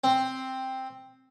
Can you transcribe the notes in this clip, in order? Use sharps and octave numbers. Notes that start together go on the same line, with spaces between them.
C4